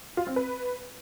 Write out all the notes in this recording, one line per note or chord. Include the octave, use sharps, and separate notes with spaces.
F4
C4
B4